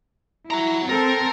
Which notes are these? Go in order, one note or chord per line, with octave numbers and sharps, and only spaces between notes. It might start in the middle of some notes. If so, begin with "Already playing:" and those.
E4 F#4 A#5
C4 A4 A#4